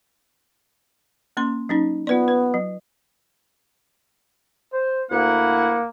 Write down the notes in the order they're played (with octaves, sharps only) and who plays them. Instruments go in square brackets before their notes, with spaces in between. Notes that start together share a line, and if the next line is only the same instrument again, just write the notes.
[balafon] A#3 C#4 C6
F#3 C#4 D#4
[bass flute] B3 [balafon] F4 B4 D5
[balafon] B4
F#3
[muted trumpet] C5
[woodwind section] D2 E4 F#5 [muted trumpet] A#3